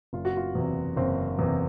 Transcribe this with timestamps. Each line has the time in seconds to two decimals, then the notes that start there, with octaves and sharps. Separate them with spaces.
0.13 F#1 F4
0.25 F#4
0.37 F4
0.55 E2 C3
0.97 F#1 C4
1.39 E2 C3